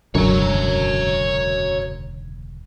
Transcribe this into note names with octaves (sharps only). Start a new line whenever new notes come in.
E1 C#2 F#2 D3 C#5 A#5